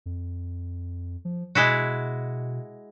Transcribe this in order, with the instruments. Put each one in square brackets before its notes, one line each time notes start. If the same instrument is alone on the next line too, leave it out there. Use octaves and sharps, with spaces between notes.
[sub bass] F2
F3
[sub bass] B2 [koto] G#3 E4 F#4